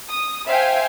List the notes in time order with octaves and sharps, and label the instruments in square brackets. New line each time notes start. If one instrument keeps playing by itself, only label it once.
[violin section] D#6
C5 E5 F5 G5 G#5